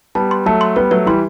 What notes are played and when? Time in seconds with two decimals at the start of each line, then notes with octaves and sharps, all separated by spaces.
0.15 G3 B3 A5
0.31 C6
0.46 F#3 A3 A5
0.61 C6
0.76 G3 B3 B4
0.91 F#3 A3 B4
1.06 E3 G3 C6